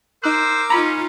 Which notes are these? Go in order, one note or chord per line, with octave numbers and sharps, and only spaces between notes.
D#4 A#4 C5 D6 E6 F#6
C#4 D#4 F4 A#5 B5